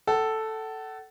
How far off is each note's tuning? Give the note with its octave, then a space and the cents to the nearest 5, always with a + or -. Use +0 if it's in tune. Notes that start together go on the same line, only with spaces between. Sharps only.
A4 +0 F#5 +35